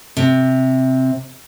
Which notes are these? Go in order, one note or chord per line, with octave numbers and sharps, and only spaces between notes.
C3